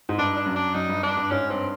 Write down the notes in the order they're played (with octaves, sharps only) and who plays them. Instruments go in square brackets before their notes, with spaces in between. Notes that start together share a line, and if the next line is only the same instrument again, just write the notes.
[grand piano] G#2
[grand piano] G2 [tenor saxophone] D4
[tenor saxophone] D4
[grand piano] F#2
[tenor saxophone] D4
[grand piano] F#2 [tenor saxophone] D#4
[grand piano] G2
[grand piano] G2 [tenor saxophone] D4
[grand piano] G2
[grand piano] G#2 [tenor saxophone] C#4
[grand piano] G2 [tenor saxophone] C4